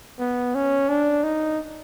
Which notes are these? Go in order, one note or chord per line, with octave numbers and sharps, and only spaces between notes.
B3
C#4
D4
D#4